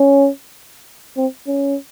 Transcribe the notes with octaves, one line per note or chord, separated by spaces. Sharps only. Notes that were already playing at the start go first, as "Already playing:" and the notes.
Already playing: C#4
C4
C#4